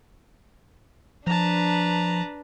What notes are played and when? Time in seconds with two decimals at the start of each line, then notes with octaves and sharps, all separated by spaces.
1.27 F3 D4 B4 A5 A#5